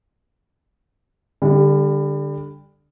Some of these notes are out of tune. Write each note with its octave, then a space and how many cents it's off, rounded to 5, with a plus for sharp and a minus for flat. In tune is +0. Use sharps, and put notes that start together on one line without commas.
D3 +0 G3 +25